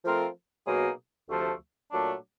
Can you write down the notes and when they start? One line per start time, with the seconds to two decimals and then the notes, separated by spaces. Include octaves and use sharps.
0.05 F3 A3 C4 F4 A#4
0.67 B2 F#3 A#3 D#4 G#4
1.29 D2 C3 F3 A3
1.92 A#2 F#3 A3 D4